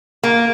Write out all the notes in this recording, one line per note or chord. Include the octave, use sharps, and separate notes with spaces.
A#3